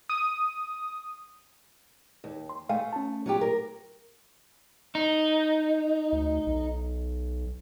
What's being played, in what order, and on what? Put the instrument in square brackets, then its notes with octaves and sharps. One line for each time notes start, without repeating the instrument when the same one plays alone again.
[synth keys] D#6
[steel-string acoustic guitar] D#2
[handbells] C6
[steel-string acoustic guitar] A3 [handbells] F5 G5 G#5
[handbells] C#4 A5
[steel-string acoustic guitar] F#3 F4 G4
A#4
[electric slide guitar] D#4
[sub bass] D2
B1